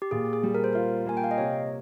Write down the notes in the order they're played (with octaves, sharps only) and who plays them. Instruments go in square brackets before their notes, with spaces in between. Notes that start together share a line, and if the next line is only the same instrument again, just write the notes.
[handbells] G4
[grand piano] A#2 [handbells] G#4
[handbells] G#4
[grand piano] G3
[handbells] A#4
C5
[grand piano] F4 [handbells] A#4
[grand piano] A#3 [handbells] G#5
[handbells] G5
F5
D#5
[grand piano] C3 [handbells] C#5